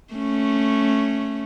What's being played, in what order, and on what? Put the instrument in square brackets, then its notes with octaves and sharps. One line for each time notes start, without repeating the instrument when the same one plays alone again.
[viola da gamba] A3 C#4